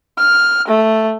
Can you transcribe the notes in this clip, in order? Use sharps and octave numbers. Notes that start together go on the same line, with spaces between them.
F6
A3